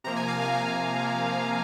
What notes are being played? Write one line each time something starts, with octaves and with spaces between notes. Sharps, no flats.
C3 F3 A#3 A#5
G#5
F5
G#5
C3 F3 A#3 F5
C3 F3 A#3